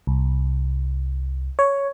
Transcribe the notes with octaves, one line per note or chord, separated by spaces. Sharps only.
C2
C#5